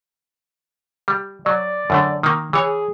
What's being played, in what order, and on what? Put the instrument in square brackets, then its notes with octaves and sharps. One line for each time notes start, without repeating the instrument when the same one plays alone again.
[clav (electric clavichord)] G3
[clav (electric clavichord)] F#3 [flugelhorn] D5
[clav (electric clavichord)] F#2 D3 A3
D#3 A#3
[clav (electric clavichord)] E3 C#5 [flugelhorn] G#4